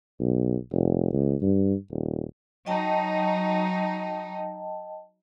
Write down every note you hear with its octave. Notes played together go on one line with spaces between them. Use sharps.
B1
F1
C#2
G2
D#1
F#3 D#4 D#5 G5 A5